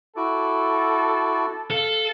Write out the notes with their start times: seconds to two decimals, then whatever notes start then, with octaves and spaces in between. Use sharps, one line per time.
0.17 E4 F#4 A4 D6
1.70 A4 F5